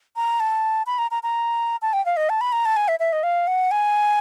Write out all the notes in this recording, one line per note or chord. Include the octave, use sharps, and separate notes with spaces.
A#5
A5
B5
A#5
A#5
A#5
A5
G5
F5
D#5
A5
B5
A#5
A5
G#5
E5
E5
D#5
F5
F#5
G#5